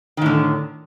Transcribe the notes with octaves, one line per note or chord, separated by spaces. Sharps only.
A2 D3 D#3